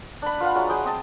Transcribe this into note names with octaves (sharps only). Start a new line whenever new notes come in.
D4 B5
F4 B4 F5 F#5
F#3 G#3
G#3 G5 C6 D#6
C4 D#5 A5